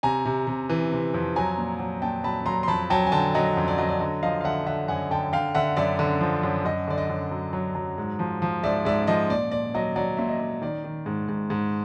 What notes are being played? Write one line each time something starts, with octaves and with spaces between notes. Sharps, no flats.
C3 G#5 A#5
C3
C3
E3
C3
F2
F#3 G#5 A#5
A#2
F#3
A#2 G5 A5
F#3 A5 B5
F#3 A#5 C6
C6
F2 A5 B5
F#3 G5 A5
G#5
D3 G5 A5
F#3 D#5
F2
D5
F#3 D#5
D5
D3 D#5
F3 D#5 F5
F5
D3 E5 F#5
D3 E5 F#5
F#2 F#5 G#5
D3 G5 A5
D3 F5 G5
D3 E5 F#5
F#2 D5 E5
D3
F3
F#2
F#2 D#5
D3 D5
D#5
F#2
F#3
F#3
F#3
G#2
F3
F3
G#2 D5 E5
G#2 D5 E5
F3 D#5
A#2 D5
A#2 D5
F#3 D#5
F#3 D5
A#2 E5
D#5
A#2
D#3 D5
D#3
G#2
G#2
G#2